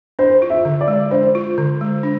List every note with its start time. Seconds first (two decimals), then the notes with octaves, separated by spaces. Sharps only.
0.19 D4 C5
0.42 F4
0.50 E5
0.65 D3
0.81 D5
0.88 G#3
1.11 D4 C5
1.35 F4
1.58 D3
1.81 G#3
2.03 D4